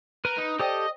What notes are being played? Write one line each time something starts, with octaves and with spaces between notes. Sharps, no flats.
A#4 B4
D#4
G4 A4 C5 D5 D#5 G5 D#6